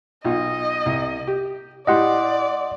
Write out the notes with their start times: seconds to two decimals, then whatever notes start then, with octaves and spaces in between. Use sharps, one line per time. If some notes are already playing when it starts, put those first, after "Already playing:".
0.24 B1 F4 D#5
0.86 C2
1.27 G4
1.87 A2 E4 G4 D5 D#5 F#5 C6